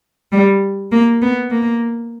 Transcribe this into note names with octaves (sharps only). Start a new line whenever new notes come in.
G3
A#3
B3
A#3